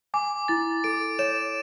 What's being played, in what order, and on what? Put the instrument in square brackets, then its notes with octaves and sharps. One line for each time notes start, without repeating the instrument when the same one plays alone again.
[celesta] G#5 [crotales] D6
[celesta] E4 [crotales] A6
[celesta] A4 [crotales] D7
[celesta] C#5 [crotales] E7